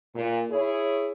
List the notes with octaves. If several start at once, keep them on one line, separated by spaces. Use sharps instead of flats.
A#2
E4 G#4 C#5